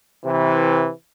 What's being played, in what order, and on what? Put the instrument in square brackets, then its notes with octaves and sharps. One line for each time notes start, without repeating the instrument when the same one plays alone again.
[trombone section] C3 E3